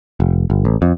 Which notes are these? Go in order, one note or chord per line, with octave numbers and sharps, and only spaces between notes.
F1
G1
A1
F2